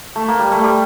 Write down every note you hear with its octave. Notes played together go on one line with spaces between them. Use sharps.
A3
A#3
G3
A3
G3